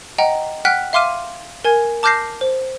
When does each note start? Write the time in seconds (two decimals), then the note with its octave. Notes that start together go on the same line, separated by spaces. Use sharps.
0.18 D#5 F#5 G5 A#5
0.65 F#5 G5 F6 F#6 B6
0.93 E5 F5 C6 D6 F6 D#7
1.65 A#4 G#5 G#6
2.03 A5 D6 F6 G6 A#6 C7
2.41 C5